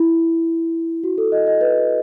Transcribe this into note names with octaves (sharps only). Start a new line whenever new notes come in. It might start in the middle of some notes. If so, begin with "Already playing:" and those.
Already playing: E4
F#4
A4
D#5
D#5
B4